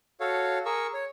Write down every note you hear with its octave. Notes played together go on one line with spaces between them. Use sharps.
F#4 A4 C#5 F5
G#4 A#4 C#6 E6
C#5